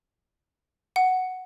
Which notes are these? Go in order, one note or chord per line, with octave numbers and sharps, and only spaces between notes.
F#5